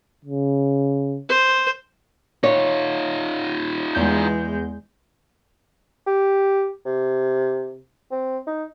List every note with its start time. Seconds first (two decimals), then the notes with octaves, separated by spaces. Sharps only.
0.25 C#3
1.29 C5
2.44 D#4 F4 C#5
3.95 E2 G#3 G6
6.07 G4
6.85 C3
8.11 C4
8.47 D#4